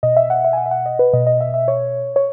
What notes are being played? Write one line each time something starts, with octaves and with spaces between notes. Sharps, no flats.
B2 D#5
E5
F#5
E5
G#5
F#5
E5
F#5
D#5
B4
B2 D#5
D#5
E5
E5
C#5
C#5